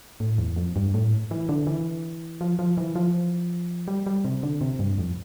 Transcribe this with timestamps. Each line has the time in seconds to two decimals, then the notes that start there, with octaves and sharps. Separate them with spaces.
0.20 A2
0.38 E2
0.57 F2
0.76 G2
0.94 A2
1.31 E3
1.49 D3
1.67 E3
2.41 F3
2.59 F3
2.77 E3
2.95 F3
3.88 G3
4.06 G3
4.25 C3
4.43 D3
4.61 C3
4.79 G2
4.98 F2